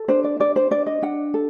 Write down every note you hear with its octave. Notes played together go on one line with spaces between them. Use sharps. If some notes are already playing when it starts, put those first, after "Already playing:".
Already playing: A4
D4 C5
D5
D4 D5
C5
D4 D5
D#5
D4 F#5
A4